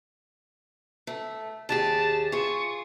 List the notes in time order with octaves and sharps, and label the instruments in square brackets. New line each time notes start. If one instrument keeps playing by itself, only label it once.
[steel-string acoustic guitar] A3
[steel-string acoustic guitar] D#2 G4 G#4 [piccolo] A5
[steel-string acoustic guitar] F4 G#4 [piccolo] C#6